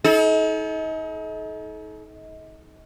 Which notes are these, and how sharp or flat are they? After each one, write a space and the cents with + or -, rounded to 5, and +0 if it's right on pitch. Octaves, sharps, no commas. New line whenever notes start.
D#4 +35 A4 -40